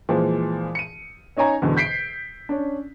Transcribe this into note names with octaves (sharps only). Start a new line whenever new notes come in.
A#2 E3 F3 G#3
C#7 D#7
C#4 D#4 C#5 G#5 A#5
E2 G#2 B2 D3
G6 B6 C7 D7
C#4 D4